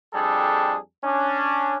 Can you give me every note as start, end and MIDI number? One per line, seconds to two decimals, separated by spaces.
0.13 0.76 41
0.13 0.76 55
0.13 0.76 62
0.13 0.76 68
0.13 0.76 69
1.03 1.77 61
1.03 1.77 62